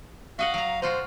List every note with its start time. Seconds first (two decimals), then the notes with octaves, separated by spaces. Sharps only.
0.39 F#4 D#5 F5 F#5
0.54 F#3 A#5
0.82 B2 F4 F#4 C5